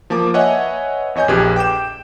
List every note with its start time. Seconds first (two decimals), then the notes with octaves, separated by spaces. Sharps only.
0.10 F3 A#3 A5 D6
0.34 B4 C#5 D#5 E5 F#5 G#5
1.15 E2 C#5 D#5 G#5 G6
1.28 A#1 F2 G4 G#4 B4 G#6
1.56 G5 D6 G6 E7